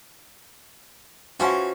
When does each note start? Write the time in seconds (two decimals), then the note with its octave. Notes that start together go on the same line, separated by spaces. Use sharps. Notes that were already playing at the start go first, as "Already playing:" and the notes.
1.40 E3 F3 C#4 F#4